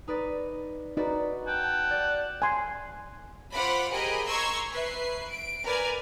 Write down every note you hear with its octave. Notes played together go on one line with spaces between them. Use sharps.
D#4 B4 D5
D#4 F#4 B4 D5
F#5 G5 A5
D5
G#5 C6
F4 C5 F#5 B5 D6
G4 G#4 A#4 D#5 B5
A#5 C6 C#6 E6 G#6
B4 E5 C7
D7
A#4 B4 D5 G#5